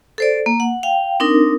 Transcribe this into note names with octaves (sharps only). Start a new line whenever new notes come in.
A4 C5 D5
A#3
F#5
F5 G5
C4 D4 D#4 A#4